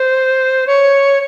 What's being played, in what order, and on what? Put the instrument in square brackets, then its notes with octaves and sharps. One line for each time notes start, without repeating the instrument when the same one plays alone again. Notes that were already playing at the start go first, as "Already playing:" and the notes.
Already playing: [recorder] C5
C#5